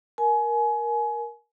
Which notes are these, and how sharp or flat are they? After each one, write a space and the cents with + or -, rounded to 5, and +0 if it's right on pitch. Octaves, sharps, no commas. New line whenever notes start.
A#4 +10 G#5 +25